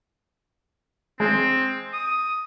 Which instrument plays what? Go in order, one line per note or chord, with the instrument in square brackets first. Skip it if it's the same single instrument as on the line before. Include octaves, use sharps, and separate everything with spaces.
[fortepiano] G#3 [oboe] C4
[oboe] D#6